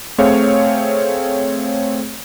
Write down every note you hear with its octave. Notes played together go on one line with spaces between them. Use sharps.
A3 C4 G#4 C#5 F5